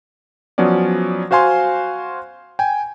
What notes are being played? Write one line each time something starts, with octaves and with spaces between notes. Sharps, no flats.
F3 F#3 B3 C#4 D5
F#4 C5 F5 G#5 C6
G5 G#5